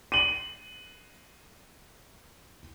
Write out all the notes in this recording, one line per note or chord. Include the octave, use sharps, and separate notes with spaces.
D#7 F#7